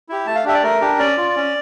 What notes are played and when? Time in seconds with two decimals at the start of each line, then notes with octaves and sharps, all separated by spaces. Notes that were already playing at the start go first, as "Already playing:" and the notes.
0.09 E4 G4
0.26 A3 A5
0.35 F5
0.44 D4 G4 E5
0.54 D5
0.63 A3 A#4
0.81 D4 G4
0.98 C#4 D5
1.17 F4
1.36 C#4